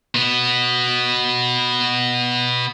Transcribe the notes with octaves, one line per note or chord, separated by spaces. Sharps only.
B2 B3